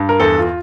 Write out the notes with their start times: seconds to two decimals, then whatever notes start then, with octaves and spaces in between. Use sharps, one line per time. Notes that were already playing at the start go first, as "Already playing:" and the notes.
Already playing: G2
0.09 A#4
0.20 E2 A4
0.38 F4